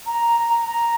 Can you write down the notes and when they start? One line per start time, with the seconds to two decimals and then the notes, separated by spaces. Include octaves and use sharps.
0.06 A#5
0.64 A#5